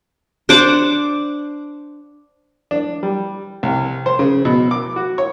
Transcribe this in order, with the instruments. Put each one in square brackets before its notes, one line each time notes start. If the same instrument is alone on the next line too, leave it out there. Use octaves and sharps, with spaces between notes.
[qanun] D4 C5 F#5 D6
[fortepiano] D4
G3
C2
C5
C#3
B2
D6
F#4
C#5